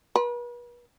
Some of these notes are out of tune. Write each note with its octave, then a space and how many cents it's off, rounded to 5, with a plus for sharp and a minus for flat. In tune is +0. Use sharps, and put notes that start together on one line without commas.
B4 -40